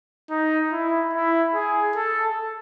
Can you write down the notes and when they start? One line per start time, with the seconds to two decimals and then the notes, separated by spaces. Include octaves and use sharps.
0.30 D#4
0.72 E4
1.13 E4
1.55 G#4
1.96 A4